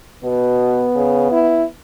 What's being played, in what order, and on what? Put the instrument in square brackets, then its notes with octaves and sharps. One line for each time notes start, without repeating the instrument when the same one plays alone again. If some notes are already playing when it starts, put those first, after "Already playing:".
[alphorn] B2 [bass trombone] B3
[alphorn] C#3
E4